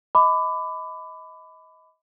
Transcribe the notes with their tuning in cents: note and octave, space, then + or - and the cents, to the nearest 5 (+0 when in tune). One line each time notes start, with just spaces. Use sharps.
D#5 +30 B5 +25 D6 +0